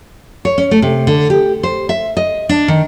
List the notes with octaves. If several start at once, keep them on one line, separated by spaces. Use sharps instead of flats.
C#5
C#4
A3
C3
D3
G4
C5
E5
D#5
D4
D#3